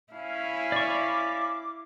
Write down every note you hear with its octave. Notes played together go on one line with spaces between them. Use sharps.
C#4 E4 F5
D5 C#6 D6